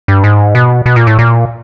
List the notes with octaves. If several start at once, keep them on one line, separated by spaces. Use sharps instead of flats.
G2
G#2
B2
B2
A#2
A2
A#2